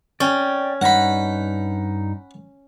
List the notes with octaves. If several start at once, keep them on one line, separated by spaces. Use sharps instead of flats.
C#4 D5 G5
G2 D#4 F#5 B5